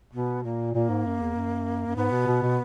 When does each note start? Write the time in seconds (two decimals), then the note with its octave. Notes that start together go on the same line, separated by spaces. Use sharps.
0.13 B2 B3
0.44 A#2 A#3
0.74 A#2 A#3
0.90 G#2
1.06 F#2
1.21 E2
1.35 F#2
1.87 F#2
1.97 G#2 B3
2.11 B2
2.27 B2
2.42 B2